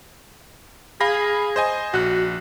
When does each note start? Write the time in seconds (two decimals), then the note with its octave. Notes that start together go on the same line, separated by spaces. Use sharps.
1.01 G#4 F5 B5 A#6
1.56 C5 D#5 G#5
1.93 A#1 F#4 F#6